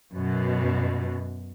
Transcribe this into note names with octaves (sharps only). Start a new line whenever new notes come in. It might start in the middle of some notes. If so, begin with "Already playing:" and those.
F#2 B2